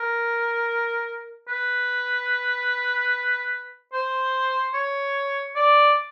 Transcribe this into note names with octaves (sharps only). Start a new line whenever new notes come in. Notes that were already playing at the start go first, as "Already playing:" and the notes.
Already playing: A#4
B4
C5
C#5
D5